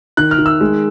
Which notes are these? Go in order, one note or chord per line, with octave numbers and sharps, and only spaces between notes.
D#3 F#6
F6
D#3
E6
G#3